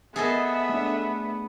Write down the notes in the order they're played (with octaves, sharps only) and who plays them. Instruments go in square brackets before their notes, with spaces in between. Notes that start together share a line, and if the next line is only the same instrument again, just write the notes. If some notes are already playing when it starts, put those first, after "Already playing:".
[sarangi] B3 [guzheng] G#4 A4 D#5 [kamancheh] E5
[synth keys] A3 D4